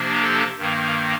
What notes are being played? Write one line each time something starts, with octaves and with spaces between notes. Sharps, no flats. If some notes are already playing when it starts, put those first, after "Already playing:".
Already playing: C3 F3 A#3 D4
A4
G2 D#3 A#3